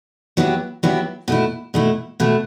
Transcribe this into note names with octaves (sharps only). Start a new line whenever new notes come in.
F#3 B3 E4 G4
F#3 B3 E4 G4
B2 A3 E4
B2 A3 E4
B2 A3 E4